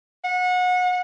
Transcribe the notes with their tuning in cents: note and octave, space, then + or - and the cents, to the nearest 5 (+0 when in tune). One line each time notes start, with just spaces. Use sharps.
F#5 -30